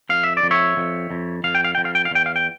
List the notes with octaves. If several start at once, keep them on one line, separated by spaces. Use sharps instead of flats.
F2 F5
E5
D5
F2
C#5 E5
F2
F2
F2 F5
G5
F5
F2 G5
F5
G5
F5
E2 G5
F5
G5